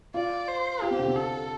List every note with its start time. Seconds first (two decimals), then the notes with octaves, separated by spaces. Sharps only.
0.14 F4 D5
0.48 C5
0.82 F4 G4
0.91 C4
0.99 D3
1.08 C3
1.16 A4